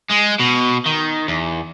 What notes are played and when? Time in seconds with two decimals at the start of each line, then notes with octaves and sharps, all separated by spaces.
0.10 G#3
0.39 B2
0.86 D#3
1.28 E2